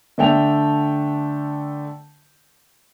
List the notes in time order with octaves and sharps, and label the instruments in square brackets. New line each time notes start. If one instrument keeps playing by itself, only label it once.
[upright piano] D3 A3 G5 F7